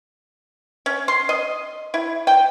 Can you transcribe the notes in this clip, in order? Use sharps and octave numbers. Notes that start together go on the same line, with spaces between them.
C#4
C6
D#5
E4
G5